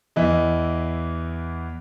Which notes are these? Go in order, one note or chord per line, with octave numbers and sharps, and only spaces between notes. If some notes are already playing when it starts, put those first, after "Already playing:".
E2 E3 D#5